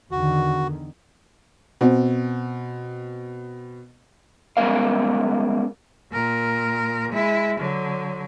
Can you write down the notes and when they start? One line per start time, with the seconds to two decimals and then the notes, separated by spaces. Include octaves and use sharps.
0.11 E2 D3 D#3 F#4
1.81 B2 C4
4.57 G3 G#3 B3 C#4 A#4 F5
6.11 A#2 A#4
7.12 G#3 E4
7.60 D3 F#3